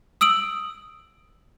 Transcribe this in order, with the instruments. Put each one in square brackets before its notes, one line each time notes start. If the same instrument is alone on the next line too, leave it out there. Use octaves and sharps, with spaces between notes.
[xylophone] D#6 E6 D7 F#7